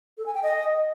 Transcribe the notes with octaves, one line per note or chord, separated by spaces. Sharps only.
A4
G#5
G5
D#5